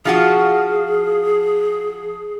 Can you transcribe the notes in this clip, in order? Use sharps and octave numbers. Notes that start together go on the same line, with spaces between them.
F3 F4 F#4 G#4